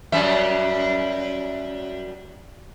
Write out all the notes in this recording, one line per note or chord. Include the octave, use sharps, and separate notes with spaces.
F#2 G3 E5